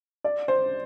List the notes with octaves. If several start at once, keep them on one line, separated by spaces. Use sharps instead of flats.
D5
C5